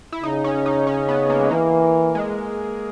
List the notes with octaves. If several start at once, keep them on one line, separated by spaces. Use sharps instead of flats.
E4
C#3 D#4
C#4
D#4
C#4
B3
A#3
G#3
E3 A#3
G#3